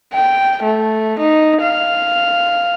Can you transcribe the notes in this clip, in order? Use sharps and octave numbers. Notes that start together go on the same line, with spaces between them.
G5
A3
D#4
F5